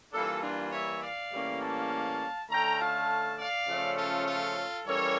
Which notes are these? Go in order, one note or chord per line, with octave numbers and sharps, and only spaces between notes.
E3 G3 A#3 D4 F4 A4
D4 F4
C#5 E5
D5 F5
A2 E3 G3 A#3 C#4
F5 A5
D3 A3 C#4 G5 A#5
F5 A5
D5 F5
C#3 F3 A3 C#4
F4 A4
F4 A4
E3 G3 A#3 C#4 A4 C#5